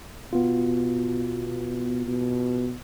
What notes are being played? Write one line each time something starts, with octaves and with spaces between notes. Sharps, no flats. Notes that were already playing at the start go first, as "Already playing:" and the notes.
B2 B3 F4
B2